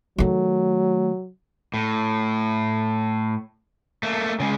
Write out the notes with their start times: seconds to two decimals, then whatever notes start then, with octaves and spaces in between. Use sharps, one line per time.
0.18 D#3 F#3 A3
1.74 A2
4.03 A3 A#3
4.40 C#3 G#3